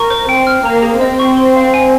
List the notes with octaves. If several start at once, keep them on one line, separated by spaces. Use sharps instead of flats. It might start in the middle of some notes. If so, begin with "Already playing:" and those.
Already playing: A#4 C#6
C5
C4 G5
F6
A#3 A#5
G#4
C4 D#5
C#6
C6
F5
G#5